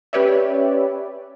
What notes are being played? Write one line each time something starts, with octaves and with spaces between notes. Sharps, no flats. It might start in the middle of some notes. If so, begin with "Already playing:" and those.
C#4 G4 B4 C#5 D5 E5